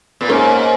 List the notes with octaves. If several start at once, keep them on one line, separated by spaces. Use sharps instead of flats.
A#2 B3
G#2 A#3 C#4